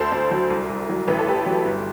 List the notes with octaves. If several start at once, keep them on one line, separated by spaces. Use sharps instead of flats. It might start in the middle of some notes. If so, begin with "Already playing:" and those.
Already playing: D2 A4 C5
D2
F#3
C2
C2
F#3
A1 B4
A4
A1 G4 B4
F#3
G1